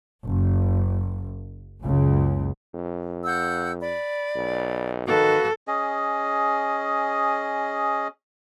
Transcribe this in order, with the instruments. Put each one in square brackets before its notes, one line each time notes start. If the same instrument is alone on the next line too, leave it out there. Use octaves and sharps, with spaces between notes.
[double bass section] F#1
F#1 C#2 C#3
[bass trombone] F2
[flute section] F#5 E6 G6
D5 B5
[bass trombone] B1
[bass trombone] D#3 [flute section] F#4 B4 F5 [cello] A4
[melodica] C#4 G#4 D#5